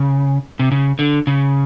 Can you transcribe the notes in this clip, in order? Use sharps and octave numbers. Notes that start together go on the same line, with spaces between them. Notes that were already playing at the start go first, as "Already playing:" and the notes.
Already playing: C#3
C3
C#3
D3
C#3